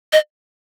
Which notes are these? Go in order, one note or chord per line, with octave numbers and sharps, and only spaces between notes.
D#5